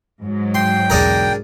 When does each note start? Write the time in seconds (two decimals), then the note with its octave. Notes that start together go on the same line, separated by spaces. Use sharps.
0.22 G#2 F#3
0.55 G5 C6
0.90 B1 E2 D4 G#4 A#4